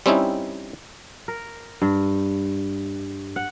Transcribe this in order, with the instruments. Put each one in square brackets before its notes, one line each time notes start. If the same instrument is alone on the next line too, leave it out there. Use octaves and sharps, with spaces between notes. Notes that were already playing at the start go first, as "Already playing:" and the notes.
[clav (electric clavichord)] G3 C4 C#4 D#4 E4
[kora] A#4
G2
F#5